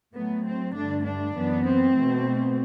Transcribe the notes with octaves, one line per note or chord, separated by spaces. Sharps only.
A2 F#3 A3 B3
C4
G2 D3 A3 D4
D4
F#2 E3 B3
C4
B2 A3